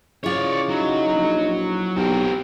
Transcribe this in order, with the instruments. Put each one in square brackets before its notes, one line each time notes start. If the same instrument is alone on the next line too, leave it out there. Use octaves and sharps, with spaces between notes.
[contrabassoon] C#3 [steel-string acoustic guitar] E4 F4 [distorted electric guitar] C#5 D5
[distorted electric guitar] F#3 [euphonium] D#4
[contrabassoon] A#1
[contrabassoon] B1 [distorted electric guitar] C4 A#4 [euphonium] G4